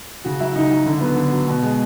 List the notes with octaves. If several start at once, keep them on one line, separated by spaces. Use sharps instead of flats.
C#3 F#4
F#3 E4
C#3 D#4
F#3
D3
F#3 B3
D3
F#3
B2
G#3